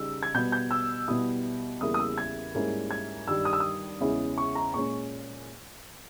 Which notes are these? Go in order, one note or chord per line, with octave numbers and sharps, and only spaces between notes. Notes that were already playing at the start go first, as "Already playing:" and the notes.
Already playing: C#3 G3 D#4 E6
G#6
B2 G3 B3 G6
G6
E6
B2 G3 B3 E4 D#6
E2 C#3 G3 A#3 E4 D#6
D#6
E6
G#6
G#2 G3 A#3 C#4 E4
G#6
G2 D#3 G3 E6
D#6
E6
D#6
E2 C#3 G#3 C#4 E4
C#6
A#5
A#2 G#3 C#4 C#6